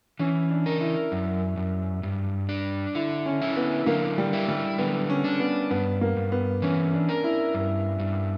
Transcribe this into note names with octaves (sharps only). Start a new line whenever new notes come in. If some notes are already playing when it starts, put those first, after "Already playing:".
E3 C#4
D4
A#4
E4
F#2
F#2
G2
D4
D3 E4
C#4
E4
B3
D3 A#3
G3
E4
G3
D3 B3
C#4
D4
B3
G2 B3
A#3
G2
B3
E3 C#4
D4
A#4
E4
G2
G2